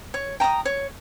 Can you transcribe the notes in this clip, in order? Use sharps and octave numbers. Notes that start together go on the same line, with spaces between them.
C#5
G5 A#5 D#6
C#5